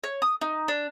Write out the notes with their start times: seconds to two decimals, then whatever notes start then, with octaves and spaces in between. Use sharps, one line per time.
0.04 C#5
0.22 D#6
0.41 D#4
0.68 D4